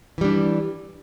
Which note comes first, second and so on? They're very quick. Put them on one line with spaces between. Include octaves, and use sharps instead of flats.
E3 G3 D4